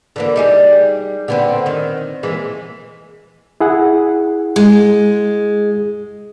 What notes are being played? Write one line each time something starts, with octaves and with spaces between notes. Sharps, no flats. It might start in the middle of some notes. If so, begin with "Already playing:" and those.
D3 E3 A#3
G3 D#4 G#4
D3 B3 C4
D#3
E3 G#3 A#3
E4 G#4 F#5
G#3